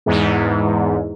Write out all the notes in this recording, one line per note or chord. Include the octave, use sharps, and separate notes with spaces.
E2 G#2